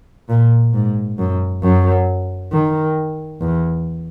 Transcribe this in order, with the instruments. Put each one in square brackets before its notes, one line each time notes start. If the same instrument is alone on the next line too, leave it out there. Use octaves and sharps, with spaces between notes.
[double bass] A#2
G#2
F#2
F#2
D#3
E2